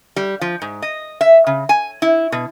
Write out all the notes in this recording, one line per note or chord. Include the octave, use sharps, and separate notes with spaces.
G3
F3
G#2
D#5
E5
C#3
G#5
E4
B2